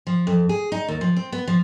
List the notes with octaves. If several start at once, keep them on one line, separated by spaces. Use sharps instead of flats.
F3
F2
G#4
D#4
D#2
F3
C4
B3
F3